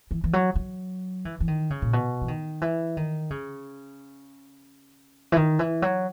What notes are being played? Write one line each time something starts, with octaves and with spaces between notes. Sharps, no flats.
E3
E3
F#3
F#3
E3
E3
D#3
C#3
A#2
B2
E3
D#3
E3
D#3
C#3
E3
D#3
E3
F#3